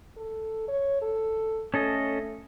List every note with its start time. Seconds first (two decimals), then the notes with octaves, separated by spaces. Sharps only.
0.17 A4
0.68 C#5
1.02 A4
1.74 A3 C#4 A4 D#5